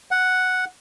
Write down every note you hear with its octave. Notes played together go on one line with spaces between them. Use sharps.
F#5